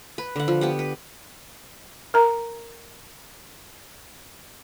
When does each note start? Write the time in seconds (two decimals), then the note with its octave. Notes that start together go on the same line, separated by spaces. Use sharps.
0.18 B4
0.36 D3 F#5
0.48 F3
0.61 B3 G4 F#5
0.79 B4
2.14 A#4 A#5